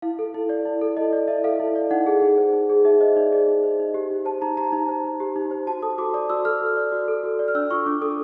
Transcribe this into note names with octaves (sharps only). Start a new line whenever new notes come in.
E4 F5
A4
E4
D5
E4
A4
E4 D#5
D5
E4 E5
A4 F5
E4
D5
D#4 F#5
G#4
D#4
C5
D#4
G#4
D#4 E5
C5 D#5
D#4 D5
G#4 D#5
D#4
C5
D#4
G4
D#4
C5 A5
D#4 A#5
G4 A#5
D#4 A#5
C5
D#4
G4
D#4
C5
F#4 A5
A4 D#6
F#4 D6
D5 D#6
F#4 E6
A4 F6
F#4
D5
F#4
A4
F#4
D5
F6
D4 E6
F4 C#6
D4 D6
A4 D#6